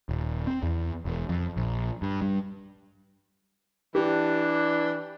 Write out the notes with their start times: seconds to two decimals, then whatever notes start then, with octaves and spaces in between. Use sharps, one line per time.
0.09 D#1
0.47 C4
0.63 E2
1.05 E1
1.29 F2
1.57 A#1
2.02 G2
2.22 G2
3.95 E3 D4 G4